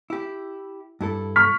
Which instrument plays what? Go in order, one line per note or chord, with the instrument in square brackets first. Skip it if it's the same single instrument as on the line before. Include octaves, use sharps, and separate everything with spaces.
[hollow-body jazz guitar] E4 G4
G2 E4 A4
[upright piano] C#6 F6 B6